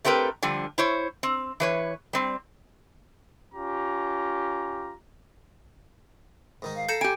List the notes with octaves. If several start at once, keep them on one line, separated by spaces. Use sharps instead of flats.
A3 C4 G4 A#4 B4
D3 F3 G3
E4 C5 C#5
C4
E3 B4 C#5
G3 C4
C#4 F4 G4 A#5
G#2 D#3 D#4
F5
A4 A#5 G6 C#7 E7
G4 G#5 D7